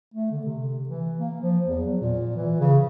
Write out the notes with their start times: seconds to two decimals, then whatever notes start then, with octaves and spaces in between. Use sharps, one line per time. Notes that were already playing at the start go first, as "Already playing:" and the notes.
0.14 A3
0.31 D3
0.45 C3
0.89 E3
1.18 A#3
1.41 F3
1.66 E2
1.87 F#3
2.01 A#2
2.36 E3
2.60 C#3